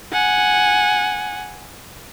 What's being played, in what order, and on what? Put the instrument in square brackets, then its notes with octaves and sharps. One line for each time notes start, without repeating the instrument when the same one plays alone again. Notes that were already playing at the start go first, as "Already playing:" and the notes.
[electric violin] F#5 G#5